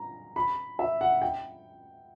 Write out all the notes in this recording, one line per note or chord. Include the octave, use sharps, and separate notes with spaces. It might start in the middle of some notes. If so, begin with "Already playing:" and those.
Already playing: A#5
B5
E5
F#5
G5